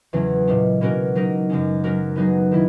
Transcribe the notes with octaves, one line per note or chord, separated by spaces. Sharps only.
E2 C#3 F#3 C#4
A#2 G#3 C#4
B2 A#3 C#4 F#4 A#4
F#3 A#3 D#4 A#4
F#2 C#3 G#3 C#4
F#3 C#4 F#4 A#4
F#3 B3 D#4 G#4
D#3 A#3 E4